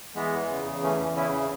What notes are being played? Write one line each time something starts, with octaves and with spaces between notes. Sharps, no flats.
E3 G#3 B3
E2
C#3
E2
E3 A3 C#4
E2
C#3 C#4 E4